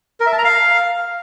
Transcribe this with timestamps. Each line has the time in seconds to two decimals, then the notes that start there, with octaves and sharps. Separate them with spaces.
0.20 A#4
0.26 E5
0.32 A5
0.38 A#5
0.45 F5